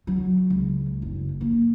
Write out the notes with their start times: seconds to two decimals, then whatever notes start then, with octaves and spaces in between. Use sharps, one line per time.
0.07 F#3
0.50 C#2
1.02 F#1
1.41 A#3